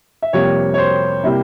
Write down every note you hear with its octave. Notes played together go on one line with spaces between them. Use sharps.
E5
F2 C3 G3 A#3 C#5
C#5
C5
C3 G3 A#3 E4